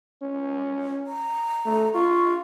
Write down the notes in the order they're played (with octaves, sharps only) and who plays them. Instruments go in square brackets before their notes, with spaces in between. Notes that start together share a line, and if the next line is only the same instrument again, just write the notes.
[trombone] C#4
[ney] A#5
[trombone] A3
[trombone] F4 [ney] C#6